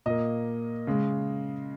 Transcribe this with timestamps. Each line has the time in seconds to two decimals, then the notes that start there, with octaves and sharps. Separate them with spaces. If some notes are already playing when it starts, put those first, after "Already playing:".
0.06 A#2 A#3 D#5
0.87 C#3 G#3